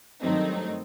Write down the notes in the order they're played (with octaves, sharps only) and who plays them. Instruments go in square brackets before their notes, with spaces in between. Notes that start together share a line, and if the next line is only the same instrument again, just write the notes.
[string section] G2 D#3 F#3 A3 C4 D#4